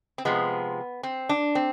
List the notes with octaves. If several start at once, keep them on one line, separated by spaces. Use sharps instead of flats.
C4
C3 F3 G#3 B3
C4
D4
C4